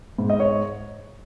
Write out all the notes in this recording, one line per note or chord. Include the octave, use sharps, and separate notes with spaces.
G#2
D#5
C#5